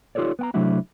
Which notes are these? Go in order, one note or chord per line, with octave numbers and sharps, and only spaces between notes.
D#4 F4 G4 A4 C#5 D5
B3 G5 A#5
C3 F#3 A3 D4 E4 F#4